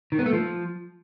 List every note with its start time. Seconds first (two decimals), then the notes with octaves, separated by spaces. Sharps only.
0.12 D#3
0.19 B3
0.26 A3
0.33 F3